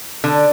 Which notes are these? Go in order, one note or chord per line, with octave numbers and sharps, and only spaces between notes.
D3